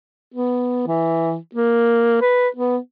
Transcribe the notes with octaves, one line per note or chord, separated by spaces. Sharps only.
B3
E3
A#3
B4
B3